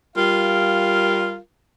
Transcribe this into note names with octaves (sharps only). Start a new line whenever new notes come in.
G3 F4 A#4 F5